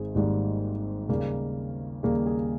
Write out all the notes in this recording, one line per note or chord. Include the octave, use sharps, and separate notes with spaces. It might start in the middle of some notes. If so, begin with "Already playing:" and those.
Already playing: G#1 G#2 G#4 C5
G#1 G#2 G3 A#3 G4
D#2 C#3 G3 A#3
D#2 C#3 G3 A#3 G#4
G#4